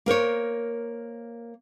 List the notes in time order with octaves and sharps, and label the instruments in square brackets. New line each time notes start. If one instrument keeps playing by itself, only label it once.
[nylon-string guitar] A#3 A#4 C5 C#5